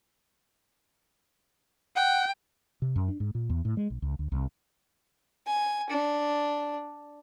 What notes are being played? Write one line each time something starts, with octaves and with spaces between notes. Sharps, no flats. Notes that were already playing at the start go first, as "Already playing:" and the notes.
F#5 G5
C3
F#2
D4
G#2
A#2
E2
A2
G#3
B1
C#2
D2
C2
G#5
D4